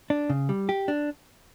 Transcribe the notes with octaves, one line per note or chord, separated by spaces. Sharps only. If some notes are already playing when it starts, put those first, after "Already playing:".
D4
C#3
G3
G4
D4